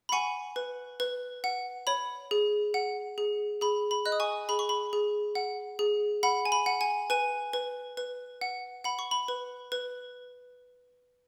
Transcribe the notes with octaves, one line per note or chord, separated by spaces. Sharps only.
B5
F#5 G#5 C#6
B4
B4
F#5
C#5 B5
G#4
F#5
G#4
G#4 B5
B5
D#5 F#6
D#6
G#5 C#6
G#4 B5
C#6
B5
G#4
F#5
G#4
F#5 B5
G#5
B5
F#5
G#5
B4 G#5
B4
B4
F#5
F#5 B5
C#6
B5
B4
B4